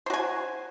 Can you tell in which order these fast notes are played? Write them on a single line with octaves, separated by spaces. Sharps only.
C5 F#4 G#5